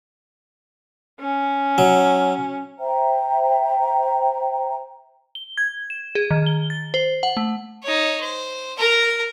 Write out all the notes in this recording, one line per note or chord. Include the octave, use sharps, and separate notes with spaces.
C#4
F#3
C5 E5 G5 A#5
G7
G#6
E7
G#4
D#3
G7
A6
C5
F#5
A3
D#4 C#5
C5
A#4 A#5